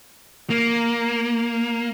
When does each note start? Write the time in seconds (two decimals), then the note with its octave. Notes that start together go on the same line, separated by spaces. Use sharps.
0.50 A#3